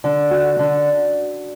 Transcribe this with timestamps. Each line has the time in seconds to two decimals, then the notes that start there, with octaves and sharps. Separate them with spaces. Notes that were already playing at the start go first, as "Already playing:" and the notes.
0.04 D3
0.31 F#4
0.59 D3